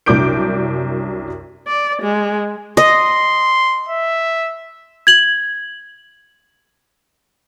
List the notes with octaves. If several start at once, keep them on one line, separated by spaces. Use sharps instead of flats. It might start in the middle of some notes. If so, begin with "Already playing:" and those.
C2 F#2 D4 D6 G6 D7
D5
G#3
D#5 C6
E5
G#6 F#7